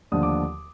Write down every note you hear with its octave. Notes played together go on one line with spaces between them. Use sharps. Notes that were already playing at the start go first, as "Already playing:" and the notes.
D#2 D3 F3 A3 D4 D#6
D6